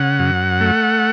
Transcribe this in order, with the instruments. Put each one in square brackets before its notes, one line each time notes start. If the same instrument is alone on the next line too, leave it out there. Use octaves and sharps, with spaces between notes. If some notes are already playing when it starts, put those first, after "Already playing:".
Already playing: [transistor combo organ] C#3 F#5
F#2
A3